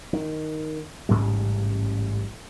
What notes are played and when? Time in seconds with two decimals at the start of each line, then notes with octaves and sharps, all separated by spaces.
0.13 D#3
1.09 A1 G#2 C#3 G3